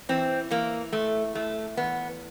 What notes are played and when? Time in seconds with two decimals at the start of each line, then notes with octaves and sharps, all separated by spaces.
0.09 E3 C4
0.51 E3 A#3
0.93 A2 A3
1.35 A2 A3
1.77 E2 B3